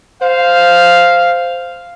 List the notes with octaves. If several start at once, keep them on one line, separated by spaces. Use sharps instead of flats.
C5 F5